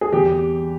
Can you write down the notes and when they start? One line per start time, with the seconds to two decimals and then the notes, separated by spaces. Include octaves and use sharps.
0.01 G#4
0.13 E2 G4